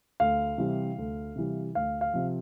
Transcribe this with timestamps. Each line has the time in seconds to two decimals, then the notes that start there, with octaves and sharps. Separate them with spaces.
0.20 D2 F5
0.58 C3 E3 G3
0.98 D2
1.36 C3 E3 G3
1.75 D2 F5
2.01 F5
2.14 C3 F3